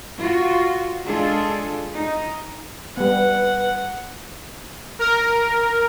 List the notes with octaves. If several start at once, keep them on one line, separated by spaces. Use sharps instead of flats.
F4 F#4
G#3 D4 F4 G#4 A4
D#4
G3 B3 B4 F#5
A#4